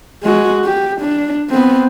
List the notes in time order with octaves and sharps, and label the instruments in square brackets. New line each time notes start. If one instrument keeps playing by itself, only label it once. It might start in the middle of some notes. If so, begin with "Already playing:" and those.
[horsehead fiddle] G#3 F#4
G4
D4
B3 C4